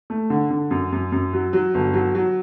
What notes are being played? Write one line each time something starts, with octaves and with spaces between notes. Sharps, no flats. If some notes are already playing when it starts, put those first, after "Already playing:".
A3
D3
D3
F#2
F#2
F#2
F#3
F#3
G1
F#3
F#3